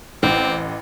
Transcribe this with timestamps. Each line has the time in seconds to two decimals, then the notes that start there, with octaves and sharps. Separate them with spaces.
0.23 A1 C4 D6